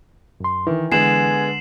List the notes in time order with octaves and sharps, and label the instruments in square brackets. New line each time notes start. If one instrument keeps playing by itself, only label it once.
[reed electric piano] F#2 C6
[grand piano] D#3 [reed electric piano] E3
[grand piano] D3 G#3 B3 [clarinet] G#5 [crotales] C7 E7 F#7